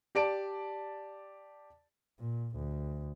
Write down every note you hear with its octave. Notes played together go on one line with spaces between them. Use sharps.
G4 D5 A5 D7
A#2
D2